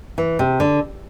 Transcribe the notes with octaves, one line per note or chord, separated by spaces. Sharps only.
E3
C3
D3